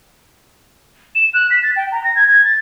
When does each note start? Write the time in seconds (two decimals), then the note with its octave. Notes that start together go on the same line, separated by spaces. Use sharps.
1.15 E7
1.33 F#6
1.50 B6
1.62 A6
1.76 G5
1.92 A#5
2.03 A#6
2.15 G#6
2.27 G#6
2.44 A6